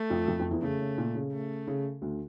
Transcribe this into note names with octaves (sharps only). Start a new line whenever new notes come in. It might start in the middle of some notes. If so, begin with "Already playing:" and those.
Already playing: A3
F2 F3
F2 F3
F2 F3
E2 E3
C#3 A3
C#3
A#2
C#3
A3
C#3
D2 D3